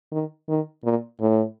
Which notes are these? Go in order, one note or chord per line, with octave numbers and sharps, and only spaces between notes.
D#3
D#3
A#2
A2